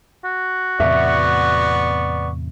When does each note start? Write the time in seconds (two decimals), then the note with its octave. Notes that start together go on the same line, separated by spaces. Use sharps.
0.24 F#4
0.80 E2 A2 C3 B3 D5 E5 C#6